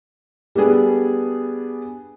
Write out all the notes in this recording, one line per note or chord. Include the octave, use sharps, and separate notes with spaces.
G3 B3 D4 G#4 A4